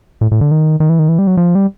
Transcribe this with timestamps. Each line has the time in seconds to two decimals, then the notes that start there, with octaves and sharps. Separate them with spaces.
0.21 A2
0.32 A2
0.41 D3
0.51 D#3
0.80 D#3
0.89 E3
0.99 D#3
1.09 E3
1.19 G3
1.27 F#3
1.37 F3
1.55 G3